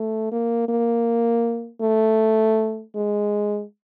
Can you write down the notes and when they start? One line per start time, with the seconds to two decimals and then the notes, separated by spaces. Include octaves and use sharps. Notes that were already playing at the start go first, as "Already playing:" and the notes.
Already playing: A3
0.32 A#3
0.69 A#3
1.81 A3
2.95 G#3